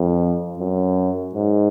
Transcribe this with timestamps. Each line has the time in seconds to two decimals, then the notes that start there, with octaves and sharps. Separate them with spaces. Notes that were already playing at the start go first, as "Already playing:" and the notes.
Already playing: F2
0.59 F#2
1.35 G#2